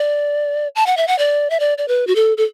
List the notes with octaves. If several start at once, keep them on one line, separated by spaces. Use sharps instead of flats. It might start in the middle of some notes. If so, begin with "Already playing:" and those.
Already playing: D5
A5
F#5
E5
F#5
D5
E5
D5
D5
B4
F#4
A4
A4